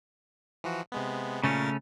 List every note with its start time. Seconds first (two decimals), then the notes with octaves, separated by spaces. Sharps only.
0.64 E3 F3 F#4
0.92 C3 G#3 B3
1.44 A#2 C#3 A3 C#4 A#4 A6